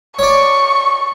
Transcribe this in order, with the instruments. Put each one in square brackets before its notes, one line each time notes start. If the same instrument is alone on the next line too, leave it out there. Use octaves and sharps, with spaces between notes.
[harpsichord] C#5 D5 [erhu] C#6